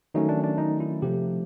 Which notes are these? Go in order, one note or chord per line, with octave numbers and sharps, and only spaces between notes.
D#3 F#3 A3 C#4 D#4
D4
D4
D#4
E4
C3 F3 A3 G4